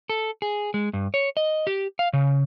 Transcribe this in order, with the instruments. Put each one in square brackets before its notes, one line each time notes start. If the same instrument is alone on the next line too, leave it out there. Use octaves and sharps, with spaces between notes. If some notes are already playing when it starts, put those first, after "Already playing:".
[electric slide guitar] A4
G#4
G#3
G2
C#5
D#5
G4
F5
C#3